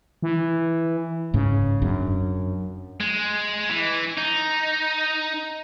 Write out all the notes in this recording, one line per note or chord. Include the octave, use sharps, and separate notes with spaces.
E3
G#2 C#3
F#2 D4
G#3
E3
D#4